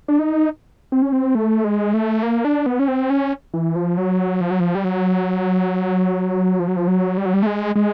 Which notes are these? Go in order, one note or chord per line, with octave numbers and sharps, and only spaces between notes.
D4
D#4
C4
C#4
C4
A3
G#3
A3
A#3
D4
B3
C#4
C4
C#4
E3
F3
F#3
F3
F#3
F3
G3
F#3
F3
F#3
F3
F#3
G3
F#3
G3
A3
G#3
G#3